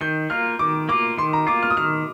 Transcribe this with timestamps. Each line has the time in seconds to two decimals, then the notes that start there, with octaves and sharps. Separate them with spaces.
0.01 D#3 G6
0.30 A#3 F4 F6
0.59 D#3 D6
0.89 A#3 F4 D6
1.17 D#3 C6
1.33 A#5
1.47 A#3 F4 D6
1.63 F6
1.70 D#6
1.77 D#3 F6